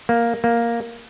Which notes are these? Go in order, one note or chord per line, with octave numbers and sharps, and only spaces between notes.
A#3
A#3